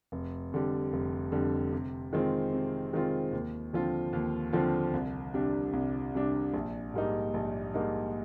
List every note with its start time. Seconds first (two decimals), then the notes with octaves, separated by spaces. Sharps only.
0.12 F1
0.52 F2 D3 G3
0.93 F1
1.32 F2 D3 G3
1.72 C3
2.13 D#3 G#3 C4 F4
2.52 C3
2.93 D#3 G#3 C4 F4
3.32 D#2
3.73 D3 F3 C4 F4
4.13 D#2
4.53 D3 F3 C4 F4
4.94 C2
5.34 C3 G3 D4
5.73 C2
6.14 C3 G3 D4
6.54 A#1
6.94 G#2 G3 A#3 D#4
7.34 A#1
7.74 G#2 G3 A#3 D#4